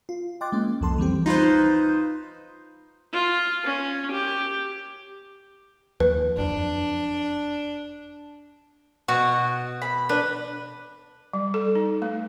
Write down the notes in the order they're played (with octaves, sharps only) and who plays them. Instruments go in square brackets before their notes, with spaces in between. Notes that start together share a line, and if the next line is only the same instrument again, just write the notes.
[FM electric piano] F4
D#5 G5 C6 D6 F#6 A6
G#3 A#3 C#4
C2 F2 F3 A4 A5 C6
E3 G3 C4 G4
[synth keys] D#4 F4 B4 C5
[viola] F4
C#4
G4
[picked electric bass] D#2 F3 [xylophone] B4
[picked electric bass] F#1 F2 [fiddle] D4
[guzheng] B2 [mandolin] F#4 C#6
[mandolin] B5
[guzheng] D4 [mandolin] B4
[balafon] G3
A4
D#4
A3